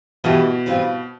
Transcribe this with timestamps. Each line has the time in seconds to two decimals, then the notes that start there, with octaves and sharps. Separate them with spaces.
0.24 B2 E3 A3 E4 G4 B4
0.66 E3 G3 C4 F4 B4